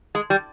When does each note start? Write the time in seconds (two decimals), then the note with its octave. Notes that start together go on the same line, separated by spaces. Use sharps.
0.15 G#3
0.30 G3